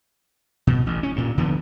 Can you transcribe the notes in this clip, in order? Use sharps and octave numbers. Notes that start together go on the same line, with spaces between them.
B2
A1
C#4
G2 A#2
D#1 D3 F3 B3